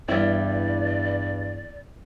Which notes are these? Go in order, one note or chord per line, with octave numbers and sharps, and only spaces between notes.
E2 G2 G3 E4 D5